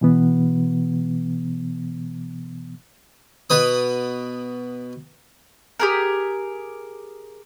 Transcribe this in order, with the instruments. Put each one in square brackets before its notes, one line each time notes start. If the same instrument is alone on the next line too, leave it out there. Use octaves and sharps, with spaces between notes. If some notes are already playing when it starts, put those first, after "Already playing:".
[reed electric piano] B2 E3 B3
[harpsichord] B2 B4 D#6
[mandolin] G4 G#4 A#4